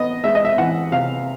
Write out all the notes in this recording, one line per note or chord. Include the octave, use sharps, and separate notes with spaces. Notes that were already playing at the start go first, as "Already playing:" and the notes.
Already playing: B3 D#5
G#3 E5
D#5
E5
E3 F#5
C3 F5